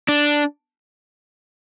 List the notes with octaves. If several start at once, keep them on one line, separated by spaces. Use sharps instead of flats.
D4